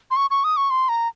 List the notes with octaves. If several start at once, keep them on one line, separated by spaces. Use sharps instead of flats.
C6
C#6
C#6
D#6
C#6
C6
A#5